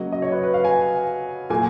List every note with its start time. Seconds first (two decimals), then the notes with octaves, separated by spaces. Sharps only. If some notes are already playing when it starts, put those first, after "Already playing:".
Already playing: C#3 F#3 A#3 D#5
0.12 D#5
0.22 C#5
0.32 B4
0.44 B4
0.54 F5
0.65 G#5
1.50 A#2 F#3 A#3 G#5